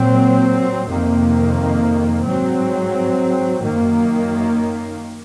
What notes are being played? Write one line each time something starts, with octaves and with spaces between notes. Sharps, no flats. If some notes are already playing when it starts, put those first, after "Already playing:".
Already playing: A#2 F#3 C4
F2 C3 D#3 A#3
G#2 F#3 C4
F#2 D#3 A#3